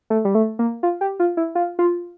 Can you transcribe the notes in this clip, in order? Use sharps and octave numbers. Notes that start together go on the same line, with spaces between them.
A3
G3
A3
A#3
F4
G4
F4
E4
F4
F4